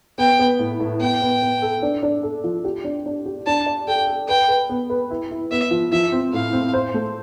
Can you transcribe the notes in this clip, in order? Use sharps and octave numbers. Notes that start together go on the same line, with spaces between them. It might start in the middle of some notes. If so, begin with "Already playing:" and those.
B3 G5
B3
A2
A2
B3 G5
B3
B3
A4
D4
D4
A4
F3
G4
D4
D4
G4
D4 A5
D5
A4 G5
A4
B4 G5
B4
B3
B4
E4
E4
B3 E5
F3
F3 E5
C4
A2 F5
C4
C5
A3